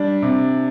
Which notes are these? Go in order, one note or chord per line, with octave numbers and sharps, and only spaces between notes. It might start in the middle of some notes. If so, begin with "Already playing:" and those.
Already playing: G3 D4
C3